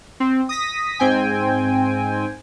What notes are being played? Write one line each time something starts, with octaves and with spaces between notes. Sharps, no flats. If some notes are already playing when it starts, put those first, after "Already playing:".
C4
D#6 A#6 B6
G#2 C4 G5 G#5